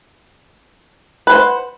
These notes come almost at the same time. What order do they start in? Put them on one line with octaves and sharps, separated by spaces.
B4 C5 F#5